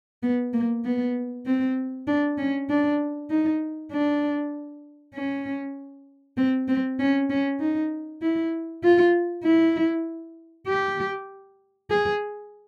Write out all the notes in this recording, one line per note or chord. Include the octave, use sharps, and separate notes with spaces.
B3
A#3
B3
C4
D4
C#4
D4
D#4
D4
C#4
C4
C4
C#4
C#4
D#4
E4
F4
E4
G4
G#4